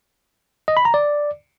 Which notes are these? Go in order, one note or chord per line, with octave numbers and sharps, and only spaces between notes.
D#5
B5
A#5
D5